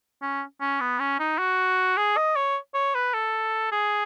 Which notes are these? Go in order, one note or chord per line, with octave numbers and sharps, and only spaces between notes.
C#4
C#4
B3
C#4
D#4
F#4
G#4
D#5
C#5
C#5
B4
A4
G#4